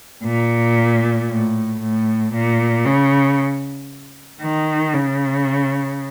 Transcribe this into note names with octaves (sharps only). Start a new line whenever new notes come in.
A#2
A2
A2
A#2
C#3
D#3
C#3